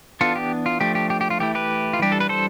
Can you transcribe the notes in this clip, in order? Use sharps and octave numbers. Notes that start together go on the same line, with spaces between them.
E3 B3 D4 F4 A4
G4
F4
F3 A3 D4 G4
G4
G4
G4
F4
E3 A3 E4 G4
G4 B4
F4
E3 G3 D4 G4
A4
B4
A4 C5